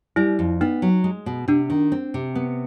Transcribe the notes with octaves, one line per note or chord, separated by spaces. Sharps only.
G3 E4
F2
B3 D#4
F#3
G#3
B2
C3 D4
D#3
C4
C3
B3